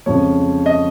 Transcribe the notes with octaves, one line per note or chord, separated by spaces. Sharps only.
F2 C#3 F3 G#3 C#5
D#5